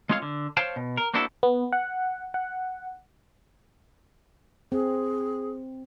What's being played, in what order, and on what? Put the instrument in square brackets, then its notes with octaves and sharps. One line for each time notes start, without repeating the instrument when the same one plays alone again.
[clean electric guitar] G#3 C4 F4 G#4 C#5 F5
D3
C5 C#5 F5 G5 A5
B2
A#4
A#3 C4 D4 E4 F#4 A4
[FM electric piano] B3
F#5
F#5
[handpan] C4 [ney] G#4